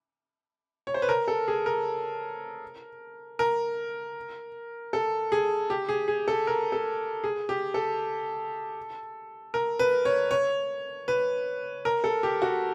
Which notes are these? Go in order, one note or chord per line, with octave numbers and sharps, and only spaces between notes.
C#5
C5
B4
A#4
A4
G#4
A#4
A#4
A4
G#4
G4
G#4
G#4
A4
A#4
A4
G#4
G4
A4
A#4
B4
C#5
C#5
B4
A#4
A4
G4
F#4